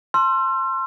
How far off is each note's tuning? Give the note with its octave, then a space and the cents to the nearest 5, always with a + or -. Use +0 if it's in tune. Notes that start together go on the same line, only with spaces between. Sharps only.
A5 +0 C6 +15 E6 +45